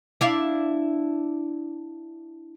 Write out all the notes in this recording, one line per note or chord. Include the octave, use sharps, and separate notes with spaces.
D4 E4 F5